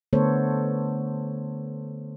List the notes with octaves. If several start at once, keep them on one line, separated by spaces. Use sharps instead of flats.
D3 A3 B3 A4 C5 C#5